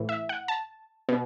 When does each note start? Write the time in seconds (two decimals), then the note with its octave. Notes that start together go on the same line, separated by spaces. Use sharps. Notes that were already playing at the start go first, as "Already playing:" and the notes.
Already playing: A2 E3
0.09 E5
0.29 F#5
0.48 A5
1.09 B2